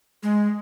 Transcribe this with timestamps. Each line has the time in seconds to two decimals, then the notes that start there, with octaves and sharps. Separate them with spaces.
0.23 G#3